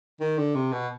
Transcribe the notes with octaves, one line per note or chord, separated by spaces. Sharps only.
D#3
D3
C3
B2